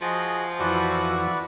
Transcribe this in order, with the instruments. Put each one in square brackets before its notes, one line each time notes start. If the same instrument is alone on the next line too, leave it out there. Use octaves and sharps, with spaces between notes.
[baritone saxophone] F3 [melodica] F#4 G#4 D#5
[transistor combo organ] F2 E3 [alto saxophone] F#4 [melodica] B4 D5 C#6